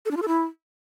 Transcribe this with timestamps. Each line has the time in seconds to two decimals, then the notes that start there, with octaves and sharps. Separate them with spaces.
0.05 A4
0.11 D4
0.17 F4
0.22 A4
0.28 E4